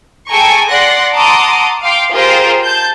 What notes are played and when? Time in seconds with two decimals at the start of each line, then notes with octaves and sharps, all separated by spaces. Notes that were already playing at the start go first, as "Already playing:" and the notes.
0.28 G#4 A4 G5 G#5 A#5 C#6
0.70 D5 F#5 C6 F#6 A#6
1.15 F#5 A5 A#5 C6 D6 D#6
1.83 F5 G5 C6 D6
2.12 F4 G4 G#4 A#4 C5
2.63 A5 G6